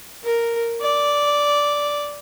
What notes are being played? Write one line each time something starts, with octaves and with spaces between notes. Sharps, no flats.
A#4
D5